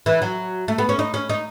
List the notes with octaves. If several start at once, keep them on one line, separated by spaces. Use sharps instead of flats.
E3
F#3
A3
B3
C#4
D#4
C#4
D#4